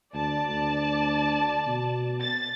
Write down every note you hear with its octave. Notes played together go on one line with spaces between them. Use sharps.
D2 D5 A5
D2
B2
A6